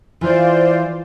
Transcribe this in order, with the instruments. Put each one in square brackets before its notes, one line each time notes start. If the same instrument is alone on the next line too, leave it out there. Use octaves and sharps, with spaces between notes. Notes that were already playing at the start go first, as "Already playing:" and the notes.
[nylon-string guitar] E3 [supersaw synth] F4 C5 D5